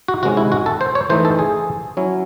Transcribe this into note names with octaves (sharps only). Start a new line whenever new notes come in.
F#4
C3 D#3 G#3 C#4 F#4
E4
F#4
A4
C5
C#5
E3 A3 D#4 C5
A4
G#4
F#3 C#4 E4